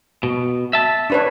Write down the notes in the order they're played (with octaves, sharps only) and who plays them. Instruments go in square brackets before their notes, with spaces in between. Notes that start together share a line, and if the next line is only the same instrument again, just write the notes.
[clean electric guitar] B2
E5 A5
[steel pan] D4 B4 C#5